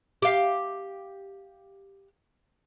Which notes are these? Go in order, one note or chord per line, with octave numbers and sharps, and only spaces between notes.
G4 F5